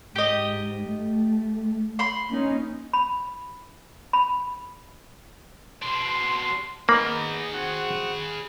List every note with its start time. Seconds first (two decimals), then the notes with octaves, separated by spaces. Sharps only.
0.16 G#2 G4 D#5
0.90 A3
1.99 B5 C6
2.29 A#3 C#4 D#4
2.93 B5
4.13 B5
5.82 B2 D4 C6
6.89 A#3 B3 D#4 G#4 B5
7.53 C4 F#4 F#5